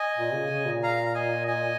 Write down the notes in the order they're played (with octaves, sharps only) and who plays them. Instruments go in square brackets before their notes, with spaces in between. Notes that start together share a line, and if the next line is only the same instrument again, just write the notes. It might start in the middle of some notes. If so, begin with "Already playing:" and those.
Already playing: [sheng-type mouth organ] D#5 G#5
[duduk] A#2
C#3
C#3
A#2
[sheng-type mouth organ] F5 A#5
F5
D#5 G#5
D#5 G#5